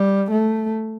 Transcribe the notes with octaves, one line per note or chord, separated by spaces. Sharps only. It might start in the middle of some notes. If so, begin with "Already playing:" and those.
Already playing: G3
A3